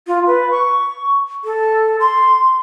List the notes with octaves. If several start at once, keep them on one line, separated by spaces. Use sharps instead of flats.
F4
B4
C#6
A4
C6